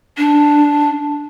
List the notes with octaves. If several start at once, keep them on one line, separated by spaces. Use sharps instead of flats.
D4